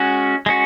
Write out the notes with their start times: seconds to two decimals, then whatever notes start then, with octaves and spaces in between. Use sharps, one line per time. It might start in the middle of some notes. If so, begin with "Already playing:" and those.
Already playing: G#3 C#4 F#4
0.46 G#3 C#4 F#4